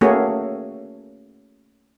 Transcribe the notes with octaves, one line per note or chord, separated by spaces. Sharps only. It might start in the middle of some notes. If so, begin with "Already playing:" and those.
A3 A#3 C#4 F#4 G#4 C#5